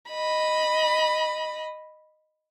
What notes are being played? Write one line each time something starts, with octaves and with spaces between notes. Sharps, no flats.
D#5 B5